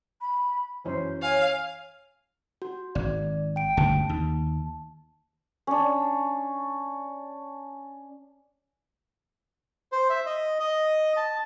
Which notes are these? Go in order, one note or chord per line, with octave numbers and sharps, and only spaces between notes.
B5
F#2 E3 C#4 C5
C#5 F5 G#5
F#4
G#1 D5
G5 D7
G1 D2 C#3 A5
D#2
C#4 D4
C5
E5
D#5
D#5
A5